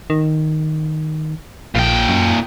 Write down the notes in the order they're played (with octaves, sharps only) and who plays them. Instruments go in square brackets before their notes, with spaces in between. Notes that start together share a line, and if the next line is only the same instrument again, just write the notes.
[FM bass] D#3
[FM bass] A#1 [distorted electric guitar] A#2 G5
[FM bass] F#2